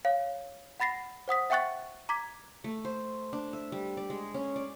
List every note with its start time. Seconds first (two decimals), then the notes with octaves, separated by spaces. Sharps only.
0.05 C#5 F5
0.80 F#5 B5 A6 A#6 C7
1.28 C5 F#5 D#6 B6
1.50 E5 F#5 G5 C#6 F#6 A6
2.09 A#5 D6 G#6 B6
2.64 A3
2.85 C5
3.33 D4
3.53 E5
3.72 G3
3.97 D5
4.10 G#3
4.34 C#4
4.56 D5